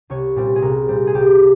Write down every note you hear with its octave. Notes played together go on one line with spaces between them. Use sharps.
C2 C#5
A#2 G3 C4
G#4
C2 A#4
A#2 G3 C4
G#4
C2 G4
A#2